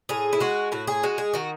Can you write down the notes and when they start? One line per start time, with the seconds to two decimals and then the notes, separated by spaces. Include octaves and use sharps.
0.09 A2 G#4
0.33 E4
0.40 G#3 F#4
0.72 A2 F#4
0.87 G#4
1.03 G#3 F#4
1.18 G#4
1.33 D#3 F#4